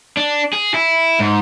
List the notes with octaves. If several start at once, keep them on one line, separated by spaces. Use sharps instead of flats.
D4
G#4
E4
G#2